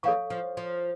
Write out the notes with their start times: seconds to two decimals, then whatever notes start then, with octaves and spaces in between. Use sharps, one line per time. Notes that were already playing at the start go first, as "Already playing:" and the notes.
0.03 E3 A4 C#5 F5 C#6
0.30 F3
0.57 F3